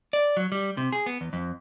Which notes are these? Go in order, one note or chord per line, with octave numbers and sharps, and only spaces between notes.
D5
F#3
G3
C3
G#4
B3
E2
F2